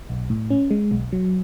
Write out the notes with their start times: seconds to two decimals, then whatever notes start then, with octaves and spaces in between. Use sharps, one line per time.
0.09 B1
0.30 A2
0.50 C#4
0.71 G#3
0.91 B1
1.12 F#3